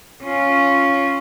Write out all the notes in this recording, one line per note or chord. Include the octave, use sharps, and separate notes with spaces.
C#4 F4